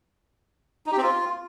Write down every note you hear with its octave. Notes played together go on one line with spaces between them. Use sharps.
D#4
G4
C4
F4